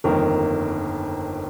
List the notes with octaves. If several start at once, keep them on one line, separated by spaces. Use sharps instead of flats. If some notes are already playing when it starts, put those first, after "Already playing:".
G1 F2 D#3 A#3 A#4